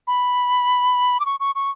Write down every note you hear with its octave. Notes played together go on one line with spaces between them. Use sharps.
B5
D6
C#6
C#6
C#6